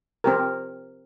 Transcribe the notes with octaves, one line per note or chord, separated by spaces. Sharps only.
C4 G4 A#4